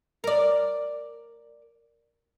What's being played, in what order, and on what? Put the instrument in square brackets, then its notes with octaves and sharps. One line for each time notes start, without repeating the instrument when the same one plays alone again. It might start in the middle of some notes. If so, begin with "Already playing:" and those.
[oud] A#4 D5